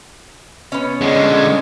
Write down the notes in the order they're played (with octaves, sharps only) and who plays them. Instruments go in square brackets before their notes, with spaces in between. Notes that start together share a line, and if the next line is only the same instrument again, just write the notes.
[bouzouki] B3 C#4
[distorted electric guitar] D3 G#3